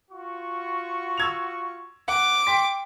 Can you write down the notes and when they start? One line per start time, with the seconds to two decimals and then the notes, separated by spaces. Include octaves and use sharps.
0.11 F4 F#4 C#6
1.17 E6 G#6 F7
2.08 F#5 D6
2.47 G5 C6 B6